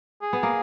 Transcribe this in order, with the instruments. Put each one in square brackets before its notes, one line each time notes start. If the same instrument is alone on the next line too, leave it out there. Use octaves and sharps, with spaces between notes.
[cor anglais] G#4
[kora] B3
A#3